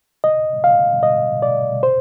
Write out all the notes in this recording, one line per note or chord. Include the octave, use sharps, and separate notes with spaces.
D#5
F5
D#5
D5
C5